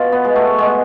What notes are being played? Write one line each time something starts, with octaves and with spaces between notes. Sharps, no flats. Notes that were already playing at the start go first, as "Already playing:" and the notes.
Already playing: B2 F4
B3
G#3
A3
B2 G#3